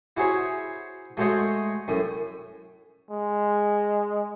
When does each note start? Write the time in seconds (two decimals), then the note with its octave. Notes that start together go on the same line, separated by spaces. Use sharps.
0.17 E4 F#4 G#4 C5 C#5
1.17 G#3 A3 F#4 C5 C#5 D#5
1.88 F#2 A2
3.11 G#3